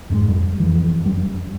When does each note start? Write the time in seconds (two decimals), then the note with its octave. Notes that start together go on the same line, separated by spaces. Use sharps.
0.10 F2 G#2 G3 G#3
0.28 F2 G3
0.60 F2 E3
1.05 F#2 G3